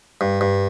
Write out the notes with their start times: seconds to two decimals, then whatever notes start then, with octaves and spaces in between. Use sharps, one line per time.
0.21 G2
0.41 G2